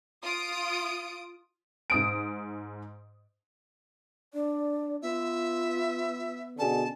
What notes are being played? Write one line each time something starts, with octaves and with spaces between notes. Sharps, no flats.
F4 D#6 D7
G#2 D#6 D7
D4 D5
B3 F4 E5
B2 D3 C#4 G#4 A5